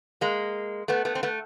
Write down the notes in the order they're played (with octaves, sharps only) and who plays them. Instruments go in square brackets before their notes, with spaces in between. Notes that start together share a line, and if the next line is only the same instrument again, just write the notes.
[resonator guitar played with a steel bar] G#3 A#3
A3 B3
A3 B3
C4
A3 B3